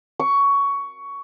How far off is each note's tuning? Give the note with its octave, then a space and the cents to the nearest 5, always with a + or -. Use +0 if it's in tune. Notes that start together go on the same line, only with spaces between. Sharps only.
C#6 +15